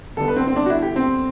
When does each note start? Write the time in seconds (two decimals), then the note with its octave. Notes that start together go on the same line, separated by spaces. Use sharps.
0.17 D3 G3 B3 A4
0.28 B4
0.36 C4
0.47 C4
0.56 D4
0.66 F#4
0.70 E4
0.82 G4
0.96 C4